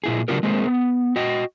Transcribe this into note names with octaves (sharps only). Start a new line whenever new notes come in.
A#2 E4 G#4
C#3 F#3 D4 F4 G4 A#4
G#3 A#3 C4 G#4
B3
F#4 D#5 G5